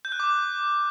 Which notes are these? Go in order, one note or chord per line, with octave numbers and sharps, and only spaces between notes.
G6
F#6
D6